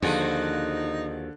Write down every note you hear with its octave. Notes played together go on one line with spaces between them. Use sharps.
D#2 D3 F3 D#4 F#4 G#4